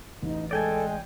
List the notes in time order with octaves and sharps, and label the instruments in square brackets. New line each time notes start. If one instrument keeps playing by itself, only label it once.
[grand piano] A1 [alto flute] D#4
[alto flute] G#3 [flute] A4 [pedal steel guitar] D5 G5 G#5